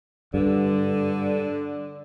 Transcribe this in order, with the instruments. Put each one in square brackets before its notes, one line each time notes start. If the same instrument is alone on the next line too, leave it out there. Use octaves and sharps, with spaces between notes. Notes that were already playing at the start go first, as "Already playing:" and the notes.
[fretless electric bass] G2 [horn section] D3